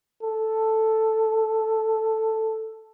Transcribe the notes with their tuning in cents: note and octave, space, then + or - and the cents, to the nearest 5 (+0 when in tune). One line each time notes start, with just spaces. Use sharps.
A4 +5